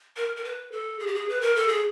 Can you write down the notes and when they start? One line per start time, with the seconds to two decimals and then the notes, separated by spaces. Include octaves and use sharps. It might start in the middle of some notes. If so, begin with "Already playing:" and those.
0.17 A#4
0.36 A#4
0.45 B4
0.72 A4
1.00 G#4
1.07 G4
1.15 G#4
1.29 B4
1.41 A#4
1.56 A4
1.68 G#4